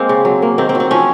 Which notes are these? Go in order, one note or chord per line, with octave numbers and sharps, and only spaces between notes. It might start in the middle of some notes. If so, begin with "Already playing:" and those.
Already playing: G#3 A#3 C4
C#3
F#3
A#3
D#3 C4
C4
F#3
C4
F3 C#4